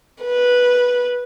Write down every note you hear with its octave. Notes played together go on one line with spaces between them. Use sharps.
B4